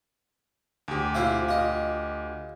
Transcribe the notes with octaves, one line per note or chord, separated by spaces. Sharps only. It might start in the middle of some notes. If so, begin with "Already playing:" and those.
D2 G4
E4 F4 C5
F4 D#5